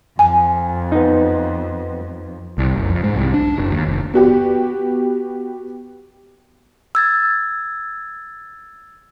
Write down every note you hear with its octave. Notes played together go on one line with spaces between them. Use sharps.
F2 G#5
B3 D#4
C2
F#1
F2
G#2
C2
D4
F#1
D#2
F1
B3 F#4 G4
E6 G#6 A6